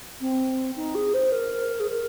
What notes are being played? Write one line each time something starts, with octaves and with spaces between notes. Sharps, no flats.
C4
D#4
G#4
C5
A#4
G#4
A#4